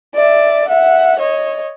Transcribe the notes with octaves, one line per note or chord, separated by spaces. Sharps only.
D5 E5
E5 F#5
C#5 D#5